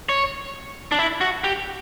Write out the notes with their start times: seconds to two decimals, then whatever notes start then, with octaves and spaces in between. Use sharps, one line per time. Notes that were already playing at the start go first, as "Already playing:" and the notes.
0.09 C#5
0.92 D4
0.99 E4
1.21 F#4
1.44 G4